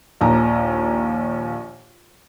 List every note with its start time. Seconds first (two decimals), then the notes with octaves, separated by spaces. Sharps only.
0.21 A#1 D#2 A#5